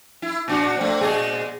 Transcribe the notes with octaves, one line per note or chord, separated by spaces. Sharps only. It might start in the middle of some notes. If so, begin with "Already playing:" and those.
E4
A#2 D4 F#4
A3 C4
A#2 G#3 G#4